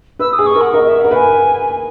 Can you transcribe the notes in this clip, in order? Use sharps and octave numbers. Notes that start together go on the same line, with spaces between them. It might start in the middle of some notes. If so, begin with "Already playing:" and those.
B4 E6
D#6
G#4
C#6
A#4
F#5
A#4 D#5
D#5
E5
A#4 F#5
B4 G#5